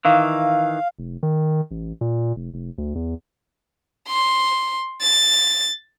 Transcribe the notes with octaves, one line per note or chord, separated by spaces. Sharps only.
D#3 E3 F5
F1
D#3
A1
A#2
F1
F1
D2
E2
C6
A6